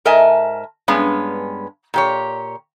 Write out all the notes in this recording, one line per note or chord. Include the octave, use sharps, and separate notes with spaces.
G#2 A#4 D#5 E5 G#5 A5
G2 G#3 B3 C#4
A#2 G4 C#5